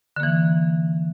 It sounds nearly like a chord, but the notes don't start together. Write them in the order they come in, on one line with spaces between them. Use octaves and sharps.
D3 A#3 E3